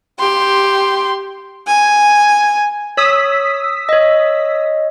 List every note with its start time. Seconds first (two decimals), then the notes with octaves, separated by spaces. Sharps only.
0.20 G4 C6
1.67 G#5
2.97 C#5 D#6 E6 B6
3.89 C#5 D#5